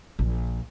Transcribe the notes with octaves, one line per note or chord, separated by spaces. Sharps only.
A#1